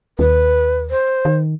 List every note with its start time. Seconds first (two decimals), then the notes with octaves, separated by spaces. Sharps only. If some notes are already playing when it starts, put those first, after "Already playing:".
0.19 D#2 B4
0.90 C5
1.25 D#3